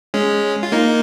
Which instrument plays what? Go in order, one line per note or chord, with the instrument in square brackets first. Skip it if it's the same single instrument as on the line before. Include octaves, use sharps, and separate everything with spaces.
[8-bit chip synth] G#3 C#4
F4
A#3 D#4